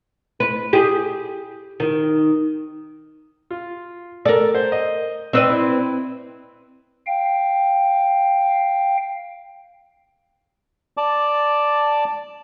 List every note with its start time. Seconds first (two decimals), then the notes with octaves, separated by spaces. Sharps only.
0.40 B4
0.73 G4 G#4
1.80 D#3
3.51 F4
4.25 A4 A#4 D5
4.55 C5
4.72 D#5
5.33 C4 B4 D5 D#5 E6
5.50 E4
7.07 F5 G5
10.97 D5 A5 D6